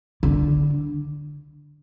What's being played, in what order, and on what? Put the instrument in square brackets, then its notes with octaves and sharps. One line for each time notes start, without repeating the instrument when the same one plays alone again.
[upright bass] D3